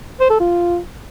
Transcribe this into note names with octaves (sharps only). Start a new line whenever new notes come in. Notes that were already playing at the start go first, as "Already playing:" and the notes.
C5
A4
F4